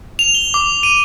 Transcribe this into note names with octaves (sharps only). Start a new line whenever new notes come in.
F7
G7
D6
D#7